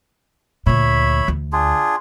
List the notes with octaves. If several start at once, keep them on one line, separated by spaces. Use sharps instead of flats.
D2 A#2 C#5 E5 B5
D2
D4 F4 G#4